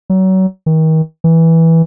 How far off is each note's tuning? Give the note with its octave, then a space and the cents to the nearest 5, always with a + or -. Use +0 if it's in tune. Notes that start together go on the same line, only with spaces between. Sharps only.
F#3 +30
D#3 +35
E3 -10